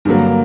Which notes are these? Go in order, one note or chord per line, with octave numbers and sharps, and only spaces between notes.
G2 D3 F#3 A#3